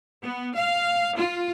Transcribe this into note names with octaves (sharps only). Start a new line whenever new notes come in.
B3
F5
F4